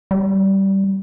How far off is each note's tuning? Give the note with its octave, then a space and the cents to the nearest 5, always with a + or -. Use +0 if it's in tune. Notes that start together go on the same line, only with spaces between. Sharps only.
G3 -15